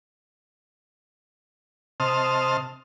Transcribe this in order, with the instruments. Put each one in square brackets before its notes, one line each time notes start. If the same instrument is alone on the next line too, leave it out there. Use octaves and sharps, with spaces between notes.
[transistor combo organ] C3 C5 D#5 A5 F6